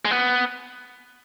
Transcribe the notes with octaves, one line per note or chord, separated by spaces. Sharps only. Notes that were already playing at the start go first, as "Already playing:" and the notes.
G#3
B3